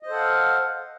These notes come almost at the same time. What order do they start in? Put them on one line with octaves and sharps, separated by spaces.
D#5 C5 A4 F#5 F5